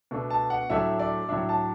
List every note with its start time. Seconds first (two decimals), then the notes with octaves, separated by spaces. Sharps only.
0.11 B2 A3 D4
0.30 A5
0.50 F#5
0.70 A2 F#3 A3 D4 E5
0.99 D5
1.29 A2 F#3 D4 E5
1.49 A5